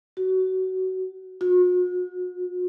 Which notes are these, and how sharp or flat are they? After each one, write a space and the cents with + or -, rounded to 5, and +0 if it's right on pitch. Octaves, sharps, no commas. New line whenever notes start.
F#4 +20
F#4 -40